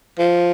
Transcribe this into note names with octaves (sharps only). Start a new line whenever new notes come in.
F3